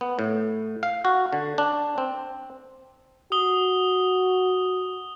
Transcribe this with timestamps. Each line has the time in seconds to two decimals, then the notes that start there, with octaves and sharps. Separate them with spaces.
0.01 B3
0.19 A2
0.83 F5
1.05 F#4
1.33 D3
1.58 D4
1.98 C4
3.32 F#4 D#6 G7